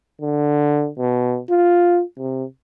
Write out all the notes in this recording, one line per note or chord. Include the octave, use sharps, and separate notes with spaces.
D3
B2
F4
C3